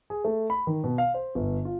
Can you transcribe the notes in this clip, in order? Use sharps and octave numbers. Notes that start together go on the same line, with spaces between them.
G#4
A3
B5
D#3
B2
F5
C5
G1
F4